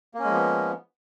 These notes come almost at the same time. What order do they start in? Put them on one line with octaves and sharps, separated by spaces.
A#3 C#4 G#3 F3 B3